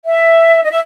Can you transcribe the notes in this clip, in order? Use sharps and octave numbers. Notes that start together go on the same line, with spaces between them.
E5
D#5
E5